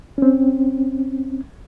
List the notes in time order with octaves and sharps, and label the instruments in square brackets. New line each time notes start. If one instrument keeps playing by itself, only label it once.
[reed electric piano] C4 C#4